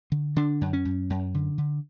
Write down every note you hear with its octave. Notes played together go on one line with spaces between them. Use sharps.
D3
D3 D4
F#2
C#4
F#2
F#2
D3
D3